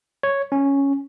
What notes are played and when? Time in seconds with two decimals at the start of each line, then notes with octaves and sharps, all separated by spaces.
0.23 C#5
0.52 C#4